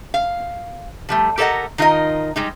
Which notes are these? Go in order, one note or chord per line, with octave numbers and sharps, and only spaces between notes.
F5
F3 G3 A3
G4 A4 A#4 D5 D#5 F#5
D#3 D#4 F4 A#4 D#5
G3 G#3 D#4